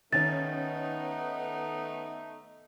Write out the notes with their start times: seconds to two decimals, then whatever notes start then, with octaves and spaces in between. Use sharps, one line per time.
0.13 D#3 A3 B3 C#4 D#4 A6